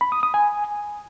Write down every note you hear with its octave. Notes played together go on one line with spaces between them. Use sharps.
B5
D#6
D#6
G#5